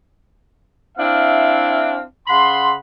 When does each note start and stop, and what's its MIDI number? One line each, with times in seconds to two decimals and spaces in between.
0.98 2.02 60
0.98 2.02 62
0.98 2.02 64
0.98 2.02 76
0.98 2.02 77
2.28 2.75 49
2.28 2.75 78
2.28 2.75 83
2.28 2.75 84